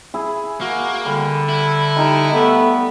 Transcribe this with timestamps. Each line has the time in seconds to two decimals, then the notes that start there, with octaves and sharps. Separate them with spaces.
0.14 E4 G#4 G#5
0.61 A#3 F#4
1.06 D3 G3
1.49 E4
1.97 G3 D#4 G4 B5
2.33 A3 B3